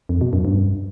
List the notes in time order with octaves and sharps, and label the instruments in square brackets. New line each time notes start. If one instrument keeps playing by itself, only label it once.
[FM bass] F2
B2
F#2
G2